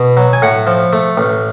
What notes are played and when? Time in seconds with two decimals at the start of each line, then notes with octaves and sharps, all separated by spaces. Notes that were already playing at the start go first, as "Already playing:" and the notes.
Already playing: B2
0.17 F#3
0.33 G#5
0.42 A2 F#5
0.67 F3
0.93 A3
1.17 A1